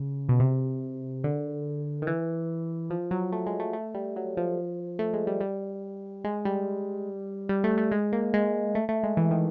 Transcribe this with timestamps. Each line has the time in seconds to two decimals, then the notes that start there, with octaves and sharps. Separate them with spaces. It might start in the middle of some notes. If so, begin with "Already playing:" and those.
Already playing: C#3
0.29 B2
0.40 C3
1.24 D3
2.02 D#3
2.07 E3
2.90 F3
3.11 F#3
3.32 A3
3.46 G#3
3.60 A3
3.73 A3
3.94 G3
4.16 F#3
4.37 F3
4.99 A3
5.14 G#3
5.27 G3
5.41 G3
6.24 G#3
6.45 G3
7.49 G3
7.64 A3
7.78 A3
7.92 G#3
8.13 A#3
8.34 G#3
8.75 A3
8.89 A3
9.03 G#3
9.17 E3
9.31 D#3